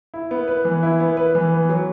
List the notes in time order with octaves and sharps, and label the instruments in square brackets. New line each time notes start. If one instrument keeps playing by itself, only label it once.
[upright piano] E4
B3
B4
E3
E4
B3
B4
E3
B3
F#3